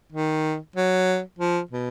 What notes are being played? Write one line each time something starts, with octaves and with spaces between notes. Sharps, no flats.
D#3
F#3
F3
B2